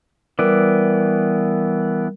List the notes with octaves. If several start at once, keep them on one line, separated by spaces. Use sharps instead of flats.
E3 G3 B3 A#4 D5